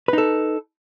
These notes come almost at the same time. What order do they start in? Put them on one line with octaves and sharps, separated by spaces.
B4 D#4 A4